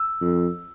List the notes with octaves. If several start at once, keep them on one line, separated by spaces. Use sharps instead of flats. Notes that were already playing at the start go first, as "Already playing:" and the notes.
Already playing: E6
F2